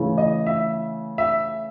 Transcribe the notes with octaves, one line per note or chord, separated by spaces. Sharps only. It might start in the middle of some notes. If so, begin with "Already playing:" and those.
Already playing: C#3 E3 A3
D#5
E5
E5